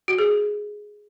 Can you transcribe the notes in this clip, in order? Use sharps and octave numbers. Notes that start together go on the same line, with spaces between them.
F#4
G#4